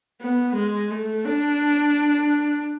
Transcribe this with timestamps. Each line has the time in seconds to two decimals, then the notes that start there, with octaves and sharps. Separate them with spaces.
0.21 B3
0.56 G#3
0.90 A3
1.25 D4